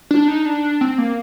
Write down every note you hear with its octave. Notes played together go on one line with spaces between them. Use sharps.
D4
D#4
D4
C4
A#3